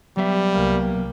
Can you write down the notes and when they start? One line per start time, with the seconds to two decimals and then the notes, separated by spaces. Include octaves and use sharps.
0.17 F#3 G3 B3 E5
0.54 C2 A#3